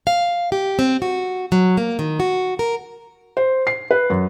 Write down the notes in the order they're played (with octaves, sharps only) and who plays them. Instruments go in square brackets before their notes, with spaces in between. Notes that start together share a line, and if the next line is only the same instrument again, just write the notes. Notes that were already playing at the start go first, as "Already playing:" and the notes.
[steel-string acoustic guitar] F5
G4
C4
F#4
F#3
A#3
D#3
F#4
A#4
[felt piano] C5
C7
B4
F#2